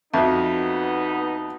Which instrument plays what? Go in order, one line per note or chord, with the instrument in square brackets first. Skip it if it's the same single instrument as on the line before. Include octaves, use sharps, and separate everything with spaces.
[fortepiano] F2 [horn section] B3 D#4 [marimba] F#4 E5